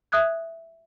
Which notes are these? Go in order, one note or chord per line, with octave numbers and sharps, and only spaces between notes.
E5 D#6 F#6 G#6